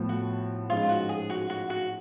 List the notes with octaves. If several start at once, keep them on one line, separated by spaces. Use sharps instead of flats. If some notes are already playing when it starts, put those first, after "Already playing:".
Already playing: A2 F3 B3
F#4
G#2 F3 G#3 C#4 F4
F#4
G#4
F#4
F#4
F#4